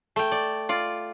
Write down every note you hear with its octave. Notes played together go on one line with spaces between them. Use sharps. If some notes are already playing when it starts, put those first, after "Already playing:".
A3 G5
D5
F4 D5